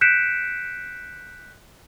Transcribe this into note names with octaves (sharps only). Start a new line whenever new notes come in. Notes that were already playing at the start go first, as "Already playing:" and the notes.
F#6 G6 B6 C#7 D7 E7